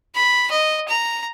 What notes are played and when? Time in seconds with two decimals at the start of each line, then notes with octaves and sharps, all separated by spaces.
0.15 B5
0.51 D#5
0.88 A#5